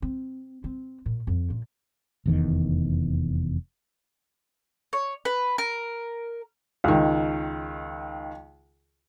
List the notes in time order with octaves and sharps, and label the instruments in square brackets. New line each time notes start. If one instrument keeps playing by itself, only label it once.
[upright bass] C4
C4
A#2
F2
A#2
[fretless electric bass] F1 E2 D#3
[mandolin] C#5
B4
A#4
[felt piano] C#2 D#3